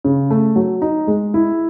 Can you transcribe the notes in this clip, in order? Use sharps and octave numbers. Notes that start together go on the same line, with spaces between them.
C#3
A3
F#3
D#4
G#3
E4